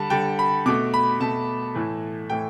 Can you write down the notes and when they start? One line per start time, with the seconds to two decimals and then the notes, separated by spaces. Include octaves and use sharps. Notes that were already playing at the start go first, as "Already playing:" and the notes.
Already playing: D3 G3 A5 B5
0.10 D3 G3 G5
0.39 B5
0.66 B2 A3 D6
0.94 B5
1.20 B2 A3 A5
1.75 A2 E3 A3
2.30 A2 E3 A3 G5